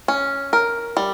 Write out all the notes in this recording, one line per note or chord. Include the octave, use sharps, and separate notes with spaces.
C#4
A#4
G3